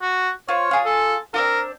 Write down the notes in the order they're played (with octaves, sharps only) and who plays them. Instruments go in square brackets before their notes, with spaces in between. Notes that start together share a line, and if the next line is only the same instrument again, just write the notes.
[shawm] F#4
[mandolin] F4 C5 [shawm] C#5
[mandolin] F4 G#4
[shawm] A4
[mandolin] C4 D4 F4 [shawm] A#4